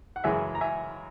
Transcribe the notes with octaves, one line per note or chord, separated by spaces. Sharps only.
F#5
F#2 C#3 E3 G#3 E5 G#5
A#5
E5 G#5